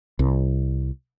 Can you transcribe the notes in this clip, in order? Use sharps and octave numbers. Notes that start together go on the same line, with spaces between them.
C2